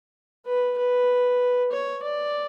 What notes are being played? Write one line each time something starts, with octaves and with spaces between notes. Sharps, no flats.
B4
B4
C#5
D5